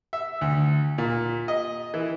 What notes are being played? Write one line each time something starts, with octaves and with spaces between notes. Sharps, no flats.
E5
D2
A#2
D#5
E3